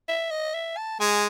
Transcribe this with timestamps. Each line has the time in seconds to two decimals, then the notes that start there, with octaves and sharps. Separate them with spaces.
0.08 E5
0.31 D#5
0.54 E5
0.77 A5
1.00 G#3 G#5